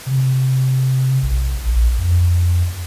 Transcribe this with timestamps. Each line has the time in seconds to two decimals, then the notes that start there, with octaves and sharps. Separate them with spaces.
0.06 C3
1.23 B1
1.65 A#1
1.98 F2